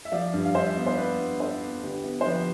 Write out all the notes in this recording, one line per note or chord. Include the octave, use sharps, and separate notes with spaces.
E5
F3 D5 F5
G2
F5
G2 C5 E5
B3
C5
B3 B4 D5
G2
D4 A4 C5
B3
D3 G4 B4
B3
C5
F3 G4 B4